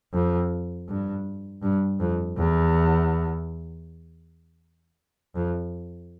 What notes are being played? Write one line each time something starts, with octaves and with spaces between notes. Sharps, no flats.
F2
G2
G2
F2
E2
F2